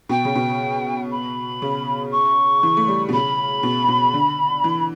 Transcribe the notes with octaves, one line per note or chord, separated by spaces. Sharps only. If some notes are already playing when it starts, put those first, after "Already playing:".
B2 G5
C#3
B2
B5
C#3
C#6
E3
A3
G3
B2
C#3 B5
B2
B2
D3
E3